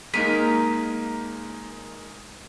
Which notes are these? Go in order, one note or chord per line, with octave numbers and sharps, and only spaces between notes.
G#3 A#3 D#4 A#4 B6 D#7